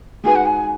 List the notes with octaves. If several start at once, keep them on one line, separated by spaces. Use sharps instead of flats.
G#3 D#4 F#4 B4 G#5
F#5
G#5